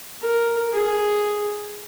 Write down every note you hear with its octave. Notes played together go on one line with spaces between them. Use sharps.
A#4
G#4